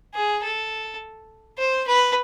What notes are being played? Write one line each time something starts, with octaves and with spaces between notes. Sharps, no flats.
G#4
A4
C5
B4